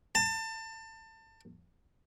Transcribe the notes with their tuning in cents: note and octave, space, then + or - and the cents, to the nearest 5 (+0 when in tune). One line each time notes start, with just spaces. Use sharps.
A5 +30